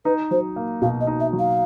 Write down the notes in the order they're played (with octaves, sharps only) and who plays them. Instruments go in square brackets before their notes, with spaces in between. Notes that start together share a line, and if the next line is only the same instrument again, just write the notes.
[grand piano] D#4 [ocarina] B4
[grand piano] F#3 [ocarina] C5
[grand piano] A#3
[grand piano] B2 [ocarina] F5
[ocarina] D#5
[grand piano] D#4
[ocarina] E5
[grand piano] F#3
[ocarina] F5